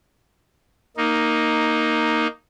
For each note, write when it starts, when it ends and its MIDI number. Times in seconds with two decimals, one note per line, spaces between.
0.97 2.27 58
0.97 2.27 63